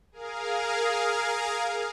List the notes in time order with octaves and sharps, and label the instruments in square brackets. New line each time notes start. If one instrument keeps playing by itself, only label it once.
[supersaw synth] G#4 A#4 F5